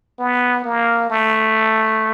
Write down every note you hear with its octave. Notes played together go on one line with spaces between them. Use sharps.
B3
A#3
A3